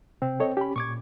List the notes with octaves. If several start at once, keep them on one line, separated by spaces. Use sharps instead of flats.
C3 C4
A4 C#5 D#5
C#4 G4 B5
A#2 C#6 D6 G#6